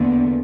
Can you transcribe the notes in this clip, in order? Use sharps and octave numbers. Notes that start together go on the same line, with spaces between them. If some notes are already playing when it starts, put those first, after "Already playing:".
Already playing: E2 D3 A#3